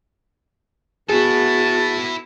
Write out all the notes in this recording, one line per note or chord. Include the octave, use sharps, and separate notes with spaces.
B3 E4 F#4 G#4 A4 A5